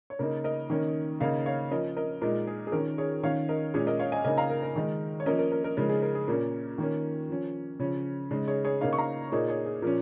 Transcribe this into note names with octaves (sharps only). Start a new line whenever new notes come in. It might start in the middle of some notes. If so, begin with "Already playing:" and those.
C#5
C#3 A#3 D#4 A#4
A#4 D#5
D#3 A#3 C#4
C#3 A#3 D#4 C#5 F5
C#5 F5
F3 C#4 A#4 D#5
A#4 D#5
A#2 G#3 D#4 A#4
G#4
G#4
D#3 C#4 A#4
G#4 C#5
D#3 C#4 C#5 F5
A#4 D#5
A#2 G#3 C#4 G#4 C#5
A#4 D#5
C#5 F5
D#5 G#5
C#3 A#3 D#4 D#5 G#5
F5 A#5
A#4
A#4
D#3 G#3 D#4
C#5
F3 A#3 C#4 A#4 D#5
A#4
A#4
A#4
C#3 F3 G#3 D#4 A#4
G#4
A#4
G#4
A#2 A#3 C#4 A#4
D#3 A#3 C#4
F3 C#4
C#3 F3 C#4
C#3 G#3 D#4
G#4 C#5
G#4 C#5
C#3 A#3 D#4 C#5 F5
C#6
F5 A#5
A#2 A#3 D#4 G#4 C#5
G#4 C#5
G#4
A#2 F3 C#4 A#4